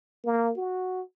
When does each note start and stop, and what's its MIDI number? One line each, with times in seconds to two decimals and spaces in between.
0.25 0.52 58
0.57 1.01 66